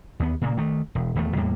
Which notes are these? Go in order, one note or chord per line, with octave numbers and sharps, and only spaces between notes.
D#2 B3
A#2 C#3 A#3
D#3 A3
E1
D#1 E2 A3
E2 A2 G3 A#3